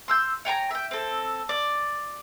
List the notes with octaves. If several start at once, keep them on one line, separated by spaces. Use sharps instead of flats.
C6 E6 G6
C#5 G5 G#5 A#5
E5 G5
C4 A4
D5